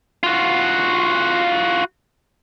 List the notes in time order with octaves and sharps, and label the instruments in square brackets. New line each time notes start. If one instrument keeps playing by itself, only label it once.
[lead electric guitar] F4 F#4